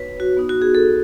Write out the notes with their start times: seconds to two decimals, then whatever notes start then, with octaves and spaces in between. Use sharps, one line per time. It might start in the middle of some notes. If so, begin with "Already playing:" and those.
Already playing: B3 D#4 F#4 B4 C#5
0.20 F#4
0.37 B3 D#4 F#4
0.49 F#4
0.62 G#4
0.75 A4